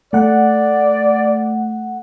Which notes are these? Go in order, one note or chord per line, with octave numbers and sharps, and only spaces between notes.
A3 D5 F#5